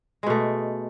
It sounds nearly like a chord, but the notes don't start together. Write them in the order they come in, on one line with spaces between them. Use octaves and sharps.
G#3 B2 A3